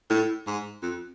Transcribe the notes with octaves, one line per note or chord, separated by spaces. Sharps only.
A2
G#2
F2